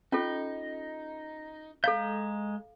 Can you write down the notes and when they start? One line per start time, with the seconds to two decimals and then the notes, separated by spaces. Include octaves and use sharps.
0.12 C#4 D#4 F4 A4
1.84 G#3 A4 F5 A#5 G6